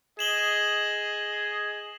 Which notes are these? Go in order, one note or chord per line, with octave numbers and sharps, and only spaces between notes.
G#4 D#5 E7 F#7 G7